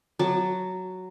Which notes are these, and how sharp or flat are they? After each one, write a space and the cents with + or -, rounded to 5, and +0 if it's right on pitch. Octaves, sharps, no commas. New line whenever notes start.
F#3 +0 A5 +0